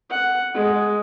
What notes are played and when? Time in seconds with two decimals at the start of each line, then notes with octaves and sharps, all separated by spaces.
0.10 F#5
0.54 G#3